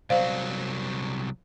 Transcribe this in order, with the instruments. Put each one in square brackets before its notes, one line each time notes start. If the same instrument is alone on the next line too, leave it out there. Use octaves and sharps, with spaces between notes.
[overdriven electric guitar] C2 F#3 [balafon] C5 D5 F5